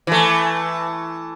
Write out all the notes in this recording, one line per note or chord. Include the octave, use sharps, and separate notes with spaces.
E3 A3